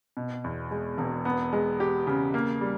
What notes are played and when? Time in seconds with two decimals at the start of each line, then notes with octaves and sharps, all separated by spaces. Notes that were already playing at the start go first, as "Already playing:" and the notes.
0.17 B2
0.44 E2
0.71 G#3
0.98 E1
1.25 B3
1.53 G#3
1.80 G4
2.07 C#3
2.34 A#3
2.61 G3